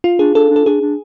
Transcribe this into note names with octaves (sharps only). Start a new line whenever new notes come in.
F4
D4 G#4
D4 A4
D4
A4
D4 G#4
D4